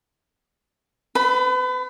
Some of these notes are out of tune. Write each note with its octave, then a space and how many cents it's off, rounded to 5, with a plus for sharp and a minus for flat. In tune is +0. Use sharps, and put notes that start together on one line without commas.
B4 +35 B5 +0